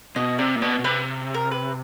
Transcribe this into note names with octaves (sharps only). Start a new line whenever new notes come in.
B2 D#5
C3 D5
A#2
B2 D5
B2
C3 B4
A#4
B4